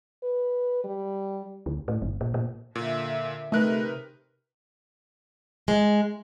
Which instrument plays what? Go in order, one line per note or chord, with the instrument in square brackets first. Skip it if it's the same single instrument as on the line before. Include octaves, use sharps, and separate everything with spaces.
[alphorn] B4
G3
[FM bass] D2
A2
G1
A#2
A#2
[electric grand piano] A#2 [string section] D3 E5
[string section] C3 [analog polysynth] A3 F#6 [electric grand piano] D#4 A#4 B4
[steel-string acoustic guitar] G#3